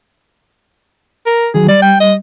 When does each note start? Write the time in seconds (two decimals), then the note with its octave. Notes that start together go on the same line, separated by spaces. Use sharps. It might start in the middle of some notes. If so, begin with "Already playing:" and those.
1.26 A#4
1.54 D#3 F#3 G#4
1.68 G3 D5
1.82 G5
2.00 D#5